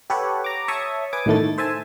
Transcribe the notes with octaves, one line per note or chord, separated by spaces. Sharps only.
G4 A4 B4 C#5 F#5
A#5 D6
C#5 E5 A5 C#6 D#6
B4 G#5 D6 D#6
A2 D#3 A3 A6
C5 E5 G#5 A5